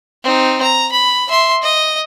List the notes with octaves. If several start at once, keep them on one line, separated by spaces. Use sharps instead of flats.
C4 D#4
A#5
B5
E5 C6
D#5